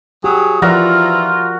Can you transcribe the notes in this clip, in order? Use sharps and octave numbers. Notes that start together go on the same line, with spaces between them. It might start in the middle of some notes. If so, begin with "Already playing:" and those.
F#3 G4 G#4
E3 F3 F4 F#4 A#4 D5